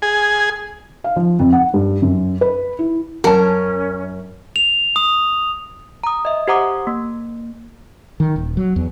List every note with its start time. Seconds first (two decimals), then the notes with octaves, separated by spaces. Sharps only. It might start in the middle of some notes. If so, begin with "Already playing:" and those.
0.02 G#4
1.04 F5
1.16 F3
1.39 F2
1.52 F#5
1.74 G2
2.02 F#2
2.41 B4
2.79 E4
3.24 F#2 C#4 A#4 F#5 A5
4.56 F7
4.96 D#6
6.04 A#5 D#6
6.25 D#5 E5
6.48 G4 C5 F#5 A#5 D6 D#6
6.87 A#3
8.20 D#3
8.36 D#1
8.57 F#3
8.76 E2